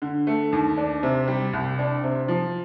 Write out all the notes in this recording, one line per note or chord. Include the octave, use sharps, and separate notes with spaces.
D3
A3
D#2
D4
C3
G3
C2
D4
C3
F3